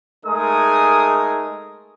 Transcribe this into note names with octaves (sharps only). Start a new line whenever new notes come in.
G#3 A3 D#4 G#4 A#4 D#6